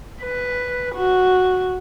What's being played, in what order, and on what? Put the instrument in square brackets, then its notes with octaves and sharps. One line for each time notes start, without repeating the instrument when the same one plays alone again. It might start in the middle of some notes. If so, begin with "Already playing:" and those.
[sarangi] B4
F#4